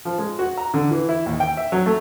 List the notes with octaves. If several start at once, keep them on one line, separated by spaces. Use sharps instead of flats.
F3
G#3
F#4
A#5
D3
E3
E4
D#2
G5
E5
F#3
A3